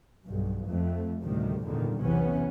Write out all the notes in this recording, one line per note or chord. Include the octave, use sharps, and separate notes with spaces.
B1 G2
F2 A3
D2 A2 C3 D#3 G3
G#1 E2 A#2 D3 D#3 G3
B1 E2 C3 E3 B3 C#4